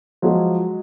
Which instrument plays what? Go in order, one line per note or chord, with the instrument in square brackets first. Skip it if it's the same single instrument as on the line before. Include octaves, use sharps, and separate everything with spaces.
[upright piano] F3 [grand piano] F#3 G#3